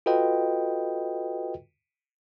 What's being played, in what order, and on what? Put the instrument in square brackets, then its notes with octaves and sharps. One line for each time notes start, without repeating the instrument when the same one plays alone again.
[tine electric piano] F4 F#4 A4 B4 D#5 G5